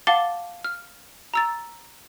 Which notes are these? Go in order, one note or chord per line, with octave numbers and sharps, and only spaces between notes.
F5 F#5 A5 D6 A6 G7
F6
A#5 E6 A6